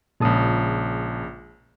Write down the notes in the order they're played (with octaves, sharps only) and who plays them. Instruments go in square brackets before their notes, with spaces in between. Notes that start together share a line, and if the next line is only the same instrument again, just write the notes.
[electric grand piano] A#1 C#3 G#3 [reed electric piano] A#2 A5 D#6